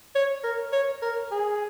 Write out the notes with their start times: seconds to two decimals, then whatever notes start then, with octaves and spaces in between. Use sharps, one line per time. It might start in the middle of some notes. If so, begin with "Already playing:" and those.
0.15 C#5
0.44 A#4
0.73 C#5
1.02 A#4
1.31 G#4